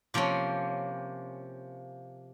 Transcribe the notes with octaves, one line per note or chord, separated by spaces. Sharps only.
C3 F3 A#3 C4 C#4